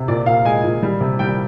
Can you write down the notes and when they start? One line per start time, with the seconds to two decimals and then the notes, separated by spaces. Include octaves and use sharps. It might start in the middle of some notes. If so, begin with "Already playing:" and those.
Already playing: C3
0.08 A#2 D5
0.26 A#2 F5
0.45 G#3 G#5
0.64 A#2
0.83 G3
1.01 C3
1.19 G3 G5